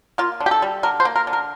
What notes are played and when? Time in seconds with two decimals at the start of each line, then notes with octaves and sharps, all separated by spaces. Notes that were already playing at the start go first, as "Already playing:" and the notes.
0.18 A#3 F4
0.40 D3
0.46 G4
0.51 A4
0.62 G3
0.83 D3 A#4
1.00 C5
1.05 A#3
1.16 A#4
1.27 D3
1.33 A#4